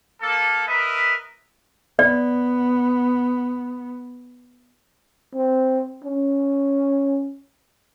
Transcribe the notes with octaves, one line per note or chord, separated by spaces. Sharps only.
A#3 A4
A#4 B4 D#5 E5
B3 D5
C4
C#4